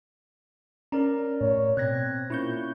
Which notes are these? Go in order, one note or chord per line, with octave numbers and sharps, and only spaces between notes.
C#4 A#4 D5 A#5
A2 C#5
B2 C4 F#6 G#6 A#6
A#2 C#4 E4 C#6 G6